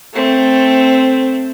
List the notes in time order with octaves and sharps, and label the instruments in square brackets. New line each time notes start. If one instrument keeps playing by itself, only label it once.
[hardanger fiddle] A3 C4